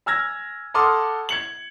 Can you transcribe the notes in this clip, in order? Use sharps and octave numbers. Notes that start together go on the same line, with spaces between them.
G#5 E6 F6 G#6 A#6
A4 F#5 C6 D6 D#6 F6
G#6 C#7 F#7